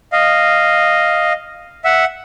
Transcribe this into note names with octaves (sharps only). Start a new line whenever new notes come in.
D#5 F5
E5 F#5